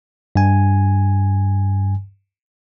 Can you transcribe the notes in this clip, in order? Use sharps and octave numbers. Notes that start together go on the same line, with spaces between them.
G2 G#5